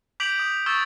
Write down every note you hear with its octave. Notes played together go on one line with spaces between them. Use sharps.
D6 G6 B6 D7 F7 F#7
D#6
F7
C#6 D#6 E6 G#6 A6